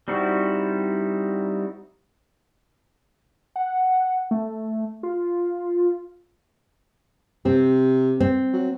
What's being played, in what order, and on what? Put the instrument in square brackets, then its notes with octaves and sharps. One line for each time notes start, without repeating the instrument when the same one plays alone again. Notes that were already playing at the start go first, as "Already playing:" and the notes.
[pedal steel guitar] G3 C4 D#4 E4 F#4
[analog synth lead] F#5
A3
F4
[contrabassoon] C3 [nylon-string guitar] C4
[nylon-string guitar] C4
[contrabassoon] F#3